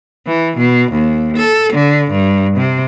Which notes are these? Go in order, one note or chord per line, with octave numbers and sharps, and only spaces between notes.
E3
B2
D#2
A4
D3
G2
C3